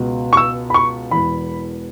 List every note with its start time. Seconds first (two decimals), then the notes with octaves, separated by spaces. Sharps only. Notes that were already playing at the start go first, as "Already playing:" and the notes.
Already playing: C#2 B2
0.33 C#6
0.37 E6
0.70 B5
0.74 C#6
1.11 E1 E2 E3 B5